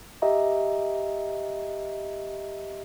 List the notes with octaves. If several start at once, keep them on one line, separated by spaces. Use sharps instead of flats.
G4 D#5 E5 A#5